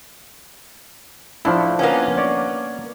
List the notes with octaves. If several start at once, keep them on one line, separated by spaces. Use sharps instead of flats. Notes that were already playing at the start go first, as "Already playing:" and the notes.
A2 F3 D4 E4
A#3 B3 C#4
C#5 D5